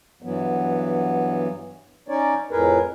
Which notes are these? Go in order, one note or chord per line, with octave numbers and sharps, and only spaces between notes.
G2 E3 F#3 B3
C#4 D#4 C#5 D5
F2 A2 G#4 A#4 B4